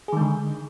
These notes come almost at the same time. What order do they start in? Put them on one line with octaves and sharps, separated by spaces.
G#4 D#3 G#3 D3